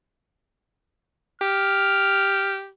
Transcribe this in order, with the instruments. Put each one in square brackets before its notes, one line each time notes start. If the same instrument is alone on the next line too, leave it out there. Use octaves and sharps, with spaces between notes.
[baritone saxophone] G4 [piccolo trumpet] F6